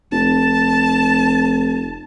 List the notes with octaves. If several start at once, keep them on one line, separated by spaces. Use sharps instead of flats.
F1 A5